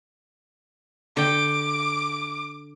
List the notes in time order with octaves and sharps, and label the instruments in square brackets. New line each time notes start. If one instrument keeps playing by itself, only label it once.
[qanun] D3 G5 [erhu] D6